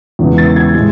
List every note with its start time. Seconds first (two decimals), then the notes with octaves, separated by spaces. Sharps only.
0.19 E2 C#3 E3 G#3 B3
0.38 A6
0.56 G#6
0.75 A2 G#3